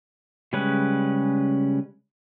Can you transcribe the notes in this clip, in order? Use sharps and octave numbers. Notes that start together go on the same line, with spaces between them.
C#3 G3 G#3 C#4 B4